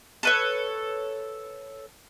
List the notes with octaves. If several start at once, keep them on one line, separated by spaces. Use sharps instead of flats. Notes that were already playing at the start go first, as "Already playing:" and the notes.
A4 B4 C#5